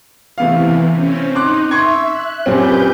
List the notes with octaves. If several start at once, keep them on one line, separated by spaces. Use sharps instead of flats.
C3 E3 A3 B3 F5
C4 C#4
D#4 C6 D6 F#6
E5 C6 C#6 G#6
F#6
F#2 A#2 C4 G4 B4 G6